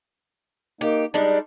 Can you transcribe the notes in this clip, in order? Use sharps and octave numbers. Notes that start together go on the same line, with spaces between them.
A#3 D#4 G4
G3 G#3 D4 D#4